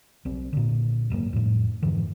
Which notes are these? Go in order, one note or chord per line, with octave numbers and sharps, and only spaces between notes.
B1 C4
A#2 D3
G#1 F#2 C#3 A#3
F2 A2
F2 G#2 D3 E3